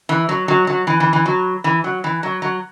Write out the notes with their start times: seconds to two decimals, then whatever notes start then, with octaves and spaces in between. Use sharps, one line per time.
0.09 E3
0.29 F#3
0.48 F#3
0.67 F#3
0.87 E3
1.00 E3
1.13 E3
1.26 F#3
1.64 E3
1.84 F#3
2.04 E3
2.23 F#3
2.42 F#3